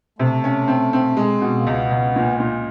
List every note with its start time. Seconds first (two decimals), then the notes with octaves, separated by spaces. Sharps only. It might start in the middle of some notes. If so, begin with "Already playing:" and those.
0.19 C3 A3
0.44 C#4
0.68 C4
0.93 C4
1.17 G#3
1.41 B2
1.56 A#3
1.67 C#2 B3
1.91 C#2
2.16 A#2
2.40 A#2